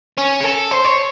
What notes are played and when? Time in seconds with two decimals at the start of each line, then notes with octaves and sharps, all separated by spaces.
0.18 C#4
0.40 G#4
0.44 A4
0.71 C5
0.85 C#5